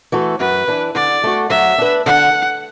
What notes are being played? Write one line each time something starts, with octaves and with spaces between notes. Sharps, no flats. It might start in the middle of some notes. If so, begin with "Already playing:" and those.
E3 A3 F#4 A4
F#2 B4
E3 D4
D3 D5
A3 F#4
F#3 E5
D4 B4
D3 F#5